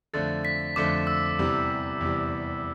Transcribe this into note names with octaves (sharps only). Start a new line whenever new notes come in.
F2 D3 A3 D4 A4 A6
B6
F2 D3 A3 D4 A4 D6
E6
E2 C3 E3 G3
E2 C3 E3 G3